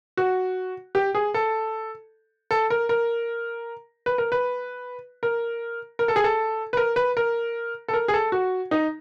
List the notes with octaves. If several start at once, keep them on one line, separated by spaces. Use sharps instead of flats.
F#4
G4
G#4
A4
A4
A#4
A#4
B4
A#4
B4
A#4
A#4
A4
G#4
A4
B4
A#4
B4
A#4
A4
A#4
G#4
A4
F#4
D#4